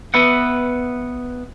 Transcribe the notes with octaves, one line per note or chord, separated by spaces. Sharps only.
B3 B4 E5 F#5